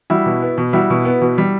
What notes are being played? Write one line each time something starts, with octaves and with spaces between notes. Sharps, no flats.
G3 E4 F#4
B2
B3
B2
G3 E4 F#4
B2
B3
B2
G3